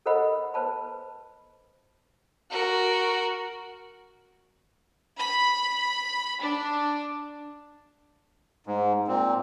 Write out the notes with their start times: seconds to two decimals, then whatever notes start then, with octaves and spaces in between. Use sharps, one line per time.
0.06 A4 A#4 C5 D#5 F#5 B5
0.54 B4 C5 A5 B5
2.50 F#4 A#4
5.18 B5
6.41 D4
8.67 G#2
9.08 A#2 C4